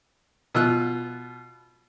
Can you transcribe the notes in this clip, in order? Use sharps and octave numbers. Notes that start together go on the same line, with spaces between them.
B2 F4 E6 F#6